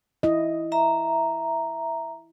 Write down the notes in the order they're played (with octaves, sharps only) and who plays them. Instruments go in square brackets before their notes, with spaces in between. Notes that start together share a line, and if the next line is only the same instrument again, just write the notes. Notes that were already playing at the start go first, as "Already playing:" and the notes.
[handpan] E4 D#5
[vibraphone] E5 A#5